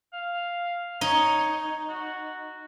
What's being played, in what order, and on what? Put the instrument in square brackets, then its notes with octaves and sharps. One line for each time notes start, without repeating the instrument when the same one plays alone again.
[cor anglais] F5
[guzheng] D#4 [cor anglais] C#5
[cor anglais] F#4